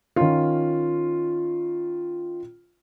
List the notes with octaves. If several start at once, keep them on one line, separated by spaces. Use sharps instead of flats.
D#3 C#4 F4